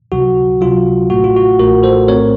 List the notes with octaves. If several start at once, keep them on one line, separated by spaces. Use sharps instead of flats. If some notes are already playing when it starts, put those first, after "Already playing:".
C#2 C3 F#3 F#4
C#2 C3 F#3 F4
A1 A2 A3 F#4
F4
F#4
A1 A2 A3 F#4 A#4
A4 C5
A#1 A2 A3 C4 A#4 C#5